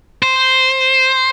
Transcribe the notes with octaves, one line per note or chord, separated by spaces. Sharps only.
C5